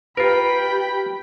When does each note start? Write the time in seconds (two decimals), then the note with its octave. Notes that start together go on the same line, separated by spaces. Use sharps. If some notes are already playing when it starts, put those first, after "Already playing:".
0.17 F4 G4 A#4 B4 G5 B5